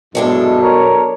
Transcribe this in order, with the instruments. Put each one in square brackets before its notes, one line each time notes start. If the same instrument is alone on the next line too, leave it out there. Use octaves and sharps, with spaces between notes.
[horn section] G2 G#3 E4 [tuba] B2 [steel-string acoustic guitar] F#3 D4 A4
[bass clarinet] A#4 [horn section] C#5